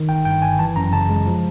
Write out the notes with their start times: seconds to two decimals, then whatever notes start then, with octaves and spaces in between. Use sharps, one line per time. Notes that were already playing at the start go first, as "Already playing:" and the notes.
Already playing: D#3
0.09 G1 G5
0.25 G2 G5
0.42 G1 G#5
0.59 E3 A5
0.76 F#2 A#5
0.93 C#3 A5
1.10 G#3
1.27 F3